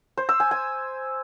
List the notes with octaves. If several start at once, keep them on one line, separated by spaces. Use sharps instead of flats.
C5
E6
G#5
G#5